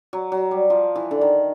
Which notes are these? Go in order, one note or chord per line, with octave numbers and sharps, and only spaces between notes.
F#3
F#3
G3
F3
E3
D3
D#3